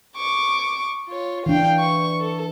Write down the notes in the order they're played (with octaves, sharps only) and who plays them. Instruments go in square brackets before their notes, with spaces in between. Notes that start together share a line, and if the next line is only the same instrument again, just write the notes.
[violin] C#6 D6
F4 C#5
[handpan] E3 D4 [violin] F5 G5
[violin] C#6
A4